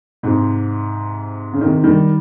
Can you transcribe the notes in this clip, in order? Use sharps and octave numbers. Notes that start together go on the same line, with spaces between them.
G#2 C3
C#3
C3 D#3
D#3 G3